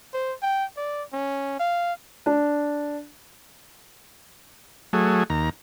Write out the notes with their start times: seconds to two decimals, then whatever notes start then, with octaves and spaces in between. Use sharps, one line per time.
0.13 C5
0.42 G5
0.77 D5
1.13 C#4
1.60 F5
2.26 D4
4.93 F#3 A3 G#4
5.30 D#2 A#5